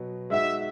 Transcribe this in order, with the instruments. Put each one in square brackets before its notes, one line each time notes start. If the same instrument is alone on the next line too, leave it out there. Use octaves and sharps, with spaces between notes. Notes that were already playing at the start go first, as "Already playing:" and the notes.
Already playing: [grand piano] B2 F#3 B3
[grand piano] G#3 D#4 F#4 [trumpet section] E5